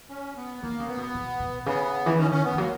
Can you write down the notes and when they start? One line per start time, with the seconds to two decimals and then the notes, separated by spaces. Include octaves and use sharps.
0.10 C#4
0.36 B3
0.62 D#3 A#3
0.80 C#3
0.88 B3
0.97 B2
1.14 B2
1.40 B2
1.66 C#3 B3
2.06 E3
2.18 D#3 C#4
2.31 C#3 C#4
2.44 B3
2.54 E3
2.57 F#3 A#3